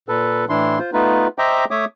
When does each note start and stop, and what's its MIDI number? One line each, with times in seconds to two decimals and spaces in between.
0.08 0.45 46
0.08 0.45 69
0.08 0.45 71
0.49 0.79 45
0.49 0.79 52
0.49 0.79 62
0.49 0.79 64
0.49 0.79 84
0.79 0.90 65
0.79 0.90 72
0.93 1.27 57
0.93 1.27 59
0.93 1.27 63
0.93 1.27 65
0.93 1.27 71
1.38 1.65 72
1.38 1.65 75
1.38 1.65 76
1.38 1.65 79
1.38 1.65 82
1.38 1.65 86
1.71 1.85 57
1.71 1.85 73
1.71 1.85 76
1.71 1.85 86
1.71 1.85 87